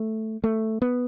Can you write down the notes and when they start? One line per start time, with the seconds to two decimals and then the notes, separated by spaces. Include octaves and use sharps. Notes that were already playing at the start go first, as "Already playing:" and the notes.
Already playing: A3
0.44 A3
0.82 B3